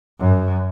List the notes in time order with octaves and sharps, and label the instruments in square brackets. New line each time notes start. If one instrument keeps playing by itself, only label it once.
[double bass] F#2